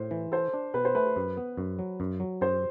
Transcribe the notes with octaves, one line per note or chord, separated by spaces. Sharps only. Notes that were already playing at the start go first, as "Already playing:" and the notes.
Already playing: A2 C5
E3
A4 C5
D4
B2 B4
C5
A3 B4
F#2
B3
F#2
F#3
F#2
F#3
F#2 C5